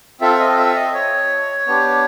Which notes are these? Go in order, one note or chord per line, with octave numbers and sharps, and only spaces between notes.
C4 F4 A4 E5
D#5
E5
D#5
C#5
B3 D4 G4